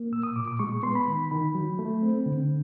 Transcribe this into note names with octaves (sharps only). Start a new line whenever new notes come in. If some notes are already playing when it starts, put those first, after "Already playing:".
Already playing: A#3
A#2 E6
D#6
A#2 D6
D6
G#3 C#6
C#6
B3 C6
B5
D#3 B5
D#3 B5
F#3
A3
C4
D3